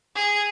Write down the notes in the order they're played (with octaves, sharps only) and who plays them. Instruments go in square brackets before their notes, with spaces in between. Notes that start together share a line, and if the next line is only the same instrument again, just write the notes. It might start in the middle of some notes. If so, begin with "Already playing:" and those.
[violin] G#4